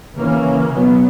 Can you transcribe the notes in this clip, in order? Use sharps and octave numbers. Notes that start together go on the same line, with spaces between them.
C#3 E3 A#3 C#4
B2 F#3 B3